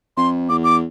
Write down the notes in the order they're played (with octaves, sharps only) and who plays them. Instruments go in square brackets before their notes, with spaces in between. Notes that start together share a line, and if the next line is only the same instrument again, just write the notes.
[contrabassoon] F2 [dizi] C6
[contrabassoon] E2 [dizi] D6
[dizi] D6